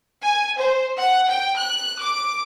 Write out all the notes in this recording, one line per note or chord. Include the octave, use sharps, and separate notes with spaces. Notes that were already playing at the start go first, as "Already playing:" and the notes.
G#5
C5
F#5
G5
F#6
D6